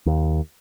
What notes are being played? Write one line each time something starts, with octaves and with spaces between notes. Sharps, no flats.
D#2